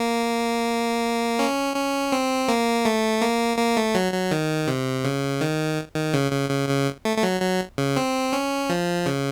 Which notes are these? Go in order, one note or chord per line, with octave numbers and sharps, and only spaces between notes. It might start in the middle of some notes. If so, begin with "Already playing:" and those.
Already playing: A#3
C#4
C#4
C4
A#3
A3
A#3
A#3
A3
F#3
F#3
D#3
C3
C#3
D#3
D#3
C#3
C#3
C#3
C#3
A3
A3
F#3
F#3
C#3
C4
C#4
F3
C#3